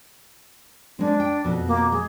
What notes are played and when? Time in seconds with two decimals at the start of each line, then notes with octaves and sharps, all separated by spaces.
0.99 G#3 C4 D4
1.20 G5
1.44 F2 B2
1.67 A#3
1.92 G#3 G#4